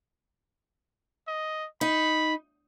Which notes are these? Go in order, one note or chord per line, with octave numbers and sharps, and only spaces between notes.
D#5
D#4 B5